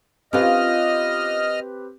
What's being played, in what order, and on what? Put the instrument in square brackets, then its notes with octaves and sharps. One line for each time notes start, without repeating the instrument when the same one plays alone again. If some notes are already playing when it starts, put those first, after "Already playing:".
[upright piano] C4 G4 B4 [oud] C#4 F4 [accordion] D#5 F6